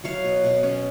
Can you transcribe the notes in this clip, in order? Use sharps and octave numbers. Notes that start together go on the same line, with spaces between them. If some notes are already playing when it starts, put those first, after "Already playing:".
F#3 C#5 F5
B2
B2
C#4